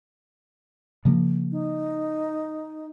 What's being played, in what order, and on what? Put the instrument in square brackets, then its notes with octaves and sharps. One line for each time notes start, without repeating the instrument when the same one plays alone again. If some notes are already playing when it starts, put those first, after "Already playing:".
[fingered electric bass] C#3 F3 A#3
[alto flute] D#4